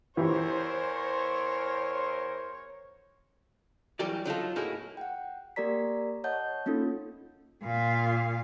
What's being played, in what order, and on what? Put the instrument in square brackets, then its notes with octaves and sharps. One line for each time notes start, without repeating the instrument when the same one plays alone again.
[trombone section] E2 A#4 C5 [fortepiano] E3 G4 [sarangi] C#5
[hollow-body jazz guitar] E3 F#3 G3 G4 A#4 D5
F#3 D#4 F4 A4
A2 A#3 D#4 E4 F#4 G#4
[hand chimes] F#5 G5
A#3 G4 A#4 D5 A#5 B6
C#5 D#5 F#5 A5 G6
A#3 C#4 D#4 F4 A4
[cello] A#2 F5